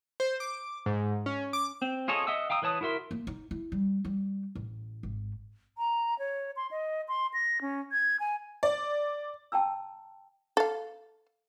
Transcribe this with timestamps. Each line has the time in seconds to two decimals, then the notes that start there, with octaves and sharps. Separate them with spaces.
0.20 C5
0.40 D6
0.86 G#2
1.26 C#4
1.53 D6
1.82 C4
2.08 F4 G#4 A4 C#5 D#5
2.27 D#5 E5 F#5 D#6 E6
2.50 F5 G5 A#5 D#6 E6
2.62 E3 B4 C#5 A5 D#6
2.81 E4 F#4 A#4 E5 C6
3.11 A#3
3.27 D#4
3.51 E4
3.72 G3
4.05 G3
4.55 A1
5.03 G#1
5.78 A#5
6.19 C#5
6.56 C6
6.71 D#5
7.08 C6
7.34 A#6
7.61 C#4
7.92 G#6
8.20 G#5
8.63 D5
9.52 G5 A5 A#5 E6
10.57 A4 F5